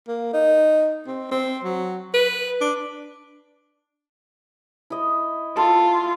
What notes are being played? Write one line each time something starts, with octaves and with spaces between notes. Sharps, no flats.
A#3
D#4
C4
C4
F#3
B4
D4
E4 D#5
F4 A4